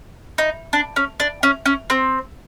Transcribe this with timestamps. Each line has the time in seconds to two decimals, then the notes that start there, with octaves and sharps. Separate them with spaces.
0.38 D#4
0.73 D4
0.96 C#4
1.20 D4
1.43 C#4
1.66 C#4
1.90 C4